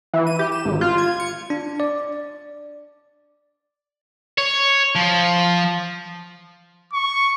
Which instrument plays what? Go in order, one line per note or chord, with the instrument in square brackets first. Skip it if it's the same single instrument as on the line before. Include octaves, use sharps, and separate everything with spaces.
[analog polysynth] E3
D#7
G4
E7
G#1
F4
G#6
C#7
[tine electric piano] D4
D5
[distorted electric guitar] C#5
F3
[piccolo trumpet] C#6